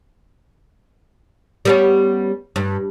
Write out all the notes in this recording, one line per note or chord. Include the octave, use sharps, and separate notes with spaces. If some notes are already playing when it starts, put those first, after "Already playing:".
G3 B3 C#4
G2